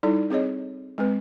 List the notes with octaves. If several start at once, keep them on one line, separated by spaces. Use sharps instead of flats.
G3 D#4 E4 A4 D5
C4 G#4 C#5 D#5
G#3 C4 B4